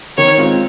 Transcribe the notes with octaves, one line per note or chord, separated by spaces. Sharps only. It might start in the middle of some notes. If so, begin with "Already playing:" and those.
D#3 C#5
G#3 C4 F4